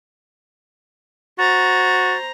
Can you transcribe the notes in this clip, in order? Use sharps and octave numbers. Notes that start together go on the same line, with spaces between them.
F#4 C5 A#5 A6